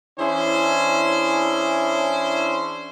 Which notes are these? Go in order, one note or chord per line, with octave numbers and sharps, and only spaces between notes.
E3 C#4 D4 E4 G#4 C5